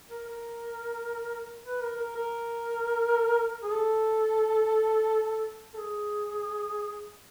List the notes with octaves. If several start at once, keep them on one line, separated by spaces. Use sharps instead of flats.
A#4
A#4
B4
A#4
A#4
A#4
G#4
A4
A4
G#4